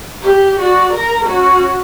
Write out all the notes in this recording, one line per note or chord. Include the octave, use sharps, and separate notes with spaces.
G4
F#4 D5
A#4 A#5
C#4 F#4